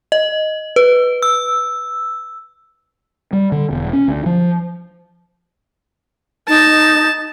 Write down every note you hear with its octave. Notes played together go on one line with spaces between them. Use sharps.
D#5
B4
E6
G3
D3
E1
C#4
D2
F3
D#4 A5